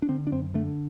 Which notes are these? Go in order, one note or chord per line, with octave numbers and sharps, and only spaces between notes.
D4
D3 C4
D4
F#2 C4
D3 A3